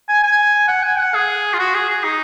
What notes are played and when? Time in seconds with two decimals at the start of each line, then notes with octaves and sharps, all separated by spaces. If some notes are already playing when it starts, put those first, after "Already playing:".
0.08 G#5
0.23 G#5
0.68 F#5
0.83 G#5
0.99 F#5
1.14 G#4
1.53 F4
1.59 F#4
1.74 G#4
1.89 G#4
2.04 D#4